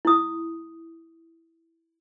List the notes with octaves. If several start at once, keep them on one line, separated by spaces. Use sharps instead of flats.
E4 D#6